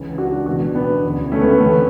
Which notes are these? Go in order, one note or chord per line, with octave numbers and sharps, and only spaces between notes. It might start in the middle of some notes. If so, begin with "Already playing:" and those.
Already playing: C#2 C#3 E3
D4 F#4
E2 B2 D4 F#4
B3 D4
D2 C#3 E3
A3 C#4
B3
A3
E2 D3 B3